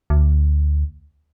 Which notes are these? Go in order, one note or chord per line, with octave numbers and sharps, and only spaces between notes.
D2